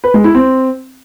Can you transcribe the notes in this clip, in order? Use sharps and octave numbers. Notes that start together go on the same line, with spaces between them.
B4
G#3
E4
C4